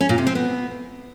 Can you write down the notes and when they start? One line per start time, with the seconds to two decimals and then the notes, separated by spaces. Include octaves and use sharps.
0.01 C#4
0.09 A#2
0.18 C3
0.27 C4
0.35 B3